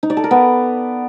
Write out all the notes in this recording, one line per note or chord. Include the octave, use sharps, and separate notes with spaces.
D#4
D5
A4
A#4
B3